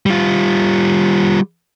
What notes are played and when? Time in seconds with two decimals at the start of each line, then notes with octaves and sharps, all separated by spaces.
0.06 G3 F4